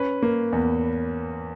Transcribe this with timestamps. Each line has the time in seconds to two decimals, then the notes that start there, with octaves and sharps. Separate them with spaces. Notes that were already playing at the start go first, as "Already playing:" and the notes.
Already playing: C#4 B4
0.22 A#3
0.52 E2